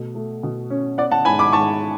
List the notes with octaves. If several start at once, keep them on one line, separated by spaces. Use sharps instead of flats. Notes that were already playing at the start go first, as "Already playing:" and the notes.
Already playing: B2 A3
A3
B2
C#4
B3 D5 F#5
F#5 A5
G#2 G#5 B5
B5 D6
G#2 A5 C#6